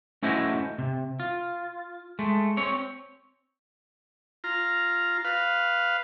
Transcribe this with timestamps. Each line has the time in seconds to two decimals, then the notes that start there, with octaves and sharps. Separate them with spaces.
0.23 A3 C#4 E4 F#4 C5 D#5
0.78 C3
1.20 F4
2.19 G#3 A3
2.57 C4 C#5
4.44 F4 A#5
5.25 B4 F5